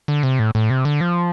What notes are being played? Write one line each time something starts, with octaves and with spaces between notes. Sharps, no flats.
D3
C3
A2
A2
C3
D3
F3